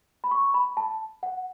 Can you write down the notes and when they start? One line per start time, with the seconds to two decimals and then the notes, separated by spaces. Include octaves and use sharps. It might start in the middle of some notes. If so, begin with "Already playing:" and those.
0.24 B5
0.31 C#6
0.54 B5
0.77 A5
1.23 F#5